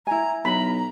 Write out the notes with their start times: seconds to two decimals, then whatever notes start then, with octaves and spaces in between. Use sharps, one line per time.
0.07 E4 G#5 A#5
0.45 B1 A#5 B5